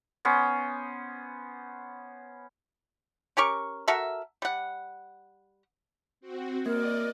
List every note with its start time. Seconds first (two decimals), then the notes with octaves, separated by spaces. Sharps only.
0.25 B3 C#4 C5
3.37 C#4 G4 A#4 C#6
3.88 F#4 A4 A#4 E5
4.42 G3 F#5
6.21 C4 F#4
6.66 A#3 A#4 D5 D#5